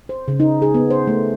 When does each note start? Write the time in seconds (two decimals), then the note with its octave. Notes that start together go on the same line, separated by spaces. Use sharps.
0.09 C5
0.28 C#3
0.40 D#4
0.62 G#4
0.74 B3
0.90 C5
1.07 A3